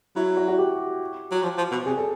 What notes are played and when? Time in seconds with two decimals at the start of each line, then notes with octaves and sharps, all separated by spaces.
0.16 F#3 E4
0.37 F#4
0.48 F#4
0.58 G4
1.31 F#3
1.43 F3
1.58 F3
1.71 B2
1.86 C3 G#4
1.98 A4